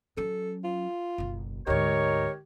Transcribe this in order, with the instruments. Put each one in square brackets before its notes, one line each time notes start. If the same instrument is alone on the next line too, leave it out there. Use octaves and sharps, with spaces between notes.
[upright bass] F#3 C#4 [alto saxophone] A4
[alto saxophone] F4
[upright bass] F#1 B1
[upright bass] D2 G#2 [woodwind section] D#4 A#4 C#5 [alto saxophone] G4